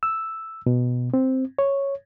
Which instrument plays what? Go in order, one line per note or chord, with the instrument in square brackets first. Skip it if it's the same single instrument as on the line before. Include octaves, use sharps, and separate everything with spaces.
[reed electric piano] E6
B2
C4
C#5